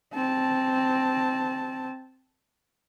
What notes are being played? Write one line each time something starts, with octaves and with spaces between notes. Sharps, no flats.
C4 A5